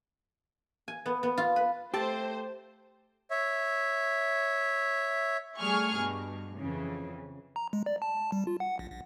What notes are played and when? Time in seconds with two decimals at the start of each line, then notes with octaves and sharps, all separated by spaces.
0.88 G#5
1.06 B3
1.23 B3
1.38 F4
1.56 B4
1.94 A3 C4 G4 C5 G5 A5
3.31 C#5 E5
5.59 G3 A3 G#4 G#5 C#6 F6
5.96 G2 B2
6.56 F2 C#3 E3
7.56 A#5
7.73 G#3
7.86 D5
8.02 A5
8.32 G3
8.47 F4
8.60 F#5
8.79 A#1
8.91 A#1